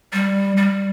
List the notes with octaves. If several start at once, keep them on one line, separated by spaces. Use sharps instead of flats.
G3
G3